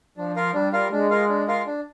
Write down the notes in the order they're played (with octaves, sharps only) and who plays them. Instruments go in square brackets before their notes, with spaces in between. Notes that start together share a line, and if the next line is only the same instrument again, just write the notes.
[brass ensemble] F3 [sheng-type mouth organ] D4
[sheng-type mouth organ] F4 A#4 F5
[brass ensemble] G3 [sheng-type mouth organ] D4
[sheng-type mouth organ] F4 A#4 F5
[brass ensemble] G#3 [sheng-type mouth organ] D4
[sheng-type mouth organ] F4 A#4 F5
D4
F4 A#4 F5
D4